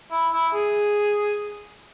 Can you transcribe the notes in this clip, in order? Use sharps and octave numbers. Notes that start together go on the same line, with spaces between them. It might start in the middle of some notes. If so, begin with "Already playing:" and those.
E4
E4
G#4